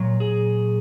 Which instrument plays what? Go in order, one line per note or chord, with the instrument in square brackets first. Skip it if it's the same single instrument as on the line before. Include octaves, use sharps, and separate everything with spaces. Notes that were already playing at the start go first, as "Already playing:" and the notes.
Already playing: [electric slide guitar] A#2 F#3
G#4